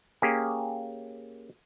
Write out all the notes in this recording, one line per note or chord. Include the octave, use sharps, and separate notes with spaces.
A#3 C#4 G4 G#4